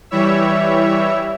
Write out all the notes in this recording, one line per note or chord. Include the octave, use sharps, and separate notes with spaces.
E3 G3 E4 C#5 E5